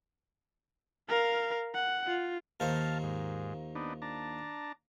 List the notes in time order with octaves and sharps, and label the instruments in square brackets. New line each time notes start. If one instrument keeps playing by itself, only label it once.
[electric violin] A#4 F5
F#5
F4
[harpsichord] D#2 A#2 C5 [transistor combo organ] F5 A5
[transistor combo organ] G#2
B3 D4 D#4
D4 A5 A#5